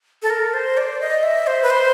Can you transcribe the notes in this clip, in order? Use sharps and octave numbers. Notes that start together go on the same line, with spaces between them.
A4
A#4
C5
D5
D#5
E5
C5
B4
C5